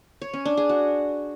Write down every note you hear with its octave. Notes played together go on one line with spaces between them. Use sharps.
C#5
C#4
D4
G#4
F#4